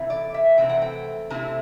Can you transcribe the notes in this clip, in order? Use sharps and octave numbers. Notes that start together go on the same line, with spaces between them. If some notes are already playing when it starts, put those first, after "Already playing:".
Already playing: C3 E3 A3 C4 E4
D5
E5
C3 E3 A3 C4 E4 G5
F#5
G5
C3 E3 A3 C4 E4 A5